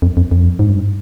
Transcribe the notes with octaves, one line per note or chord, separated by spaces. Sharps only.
F2
F2
F2
G#2
G2